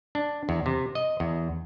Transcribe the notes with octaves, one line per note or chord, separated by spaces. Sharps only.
D4
E2
C3
D#5
E2